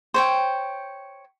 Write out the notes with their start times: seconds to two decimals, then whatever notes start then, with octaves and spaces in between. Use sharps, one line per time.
0.14 C5 C#5 G5